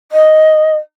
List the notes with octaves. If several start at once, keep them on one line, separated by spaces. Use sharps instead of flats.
D#5